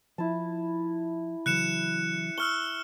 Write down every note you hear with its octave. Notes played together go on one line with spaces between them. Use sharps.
F3 E4 A5
C#3 E3 F#3 F#6 C#7 E7
C#6 E6 F6 G7